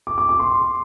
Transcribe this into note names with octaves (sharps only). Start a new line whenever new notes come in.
D6
D6
D6
C6